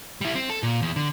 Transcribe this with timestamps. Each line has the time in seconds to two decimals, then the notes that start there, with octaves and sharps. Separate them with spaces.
0.21 G3 E4
0.35 C4
0.50 A4
0.63 A#2
0.82 E2
0.96 D3